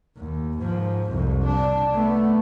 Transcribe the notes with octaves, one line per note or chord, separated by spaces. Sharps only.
D#2
G#2 F3
C2 F2
D4
A3 B3